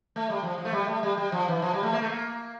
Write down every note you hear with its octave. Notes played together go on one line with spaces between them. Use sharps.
A3
G3
F3
F3
A3
G3
A3
G3
G3
F3
E3
F3
G3
A3
A#3
A3
A#3